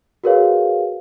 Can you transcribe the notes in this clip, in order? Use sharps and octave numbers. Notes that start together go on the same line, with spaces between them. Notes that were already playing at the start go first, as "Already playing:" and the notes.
F#4 G#4 A#4 B4 C#5 F5